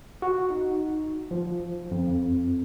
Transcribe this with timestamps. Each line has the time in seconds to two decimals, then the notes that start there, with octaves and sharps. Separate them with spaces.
0.22 F#4
0.50 D#4
1.31 F3
1.91 F2